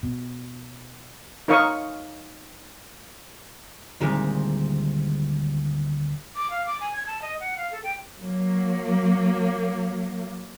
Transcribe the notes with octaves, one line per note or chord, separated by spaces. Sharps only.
B2
D#4 A#4 C#5 F5 C#6 D#6
D2 A#2 D#3 G3 G#3 C4
D6
F5
D6
G#5
G#6
A5
D#5
F#5
F5
A4
G5
F#3 A#3